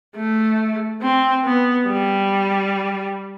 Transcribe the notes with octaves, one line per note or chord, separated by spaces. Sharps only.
A3
C4
B3
G3